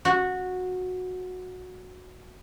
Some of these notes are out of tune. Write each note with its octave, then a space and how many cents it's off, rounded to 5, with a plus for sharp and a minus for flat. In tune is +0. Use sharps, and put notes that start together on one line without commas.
F#4 -15